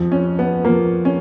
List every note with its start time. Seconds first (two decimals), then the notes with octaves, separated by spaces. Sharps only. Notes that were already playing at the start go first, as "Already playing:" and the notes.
Already playing: F2 F3
0.12 C#4
0.39 B3
0.65 F2 F3 A#3
1.05 C#4